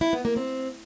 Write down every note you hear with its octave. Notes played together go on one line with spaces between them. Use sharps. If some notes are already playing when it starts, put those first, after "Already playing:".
E4
B3
A#3
C4